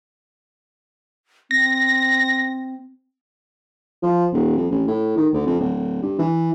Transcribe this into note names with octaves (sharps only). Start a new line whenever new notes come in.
C4 A#6
F3
D#1
F2
A1
A2
D#3
D2
F2
D1
G2
E3